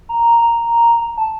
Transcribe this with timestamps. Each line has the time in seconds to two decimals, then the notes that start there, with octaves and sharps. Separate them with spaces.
0.09 A#5
0.38 A#5
0.98 A#5
1.17 A5